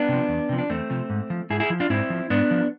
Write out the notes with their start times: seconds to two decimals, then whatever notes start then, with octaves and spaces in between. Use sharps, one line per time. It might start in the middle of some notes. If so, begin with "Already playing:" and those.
Already playing: B3 D4
0.09 C3 F3
0.29 E2
0.49 C3 F3
0.58 D4
0.69 E2 A3 C4
0.90 C3 F3
1.10 G#2
1.30 F3
1.50 G#2 E4 G#4
1.60 E4 G#4
1.70 F3
1.80 D4 F4
1.90 G#2 C4 E4
2.10 F3
2.30 G#2 B3 D4
2.51 F3